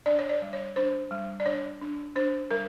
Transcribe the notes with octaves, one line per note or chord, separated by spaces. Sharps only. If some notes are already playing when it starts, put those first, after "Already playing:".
D4 D5
C#5
D5
G3
C#5
D4 C5
G3
D5
D4 C#5
D4
D4 C5
G3 A#4